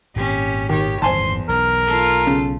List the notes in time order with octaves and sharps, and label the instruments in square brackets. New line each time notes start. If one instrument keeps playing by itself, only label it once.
[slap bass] G#1 A#2 [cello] C#4 G4
[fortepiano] D#3 [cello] G4 C#5
[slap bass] D1 G1 D#3 [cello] E2 [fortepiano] C5 G#5 A5 [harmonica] C6
[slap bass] B1 [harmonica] A#4
[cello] F4 A4
[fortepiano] C#3